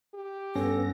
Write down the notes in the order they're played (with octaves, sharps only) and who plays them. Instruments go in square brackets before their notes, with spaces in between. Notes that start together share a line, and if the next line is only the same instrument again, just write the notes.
[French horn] G4
[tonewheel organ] G2 B3 A#6 [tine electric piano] C#4 [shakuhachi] A4